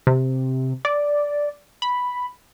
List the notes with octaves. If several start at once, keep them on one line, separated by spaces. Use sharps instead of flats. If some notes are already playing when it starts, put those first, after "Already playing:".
C3
D5
B5